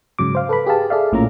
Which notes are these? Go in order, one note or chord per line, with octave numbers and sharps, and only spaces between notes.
G#2 C#3 F#3 D6
C5 F5
A4 B4 B5
G4 G#4 B4 F5 A5
G#4 A4 D5 E5 F5
A#1 A2 A#3 C#4 F4 A#5